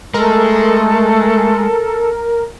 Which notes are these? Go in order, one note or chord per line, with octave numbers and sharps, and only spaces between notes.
G#3 A3 A4 A#4